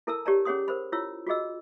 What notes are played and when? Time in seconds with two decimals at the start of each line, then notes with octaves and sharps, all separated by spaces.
0.07 E4 A4 A#4 A5 A#5 E6
0.26 G4 C#5 D5 A5 A#5
0.45 C#4 G#4 C#5 F#5 C6 D#6
0.68 A#4 C5 B5
0.92 E4 F4 C#5 E6
1.27 F4 F#4 G#4 D#5 E6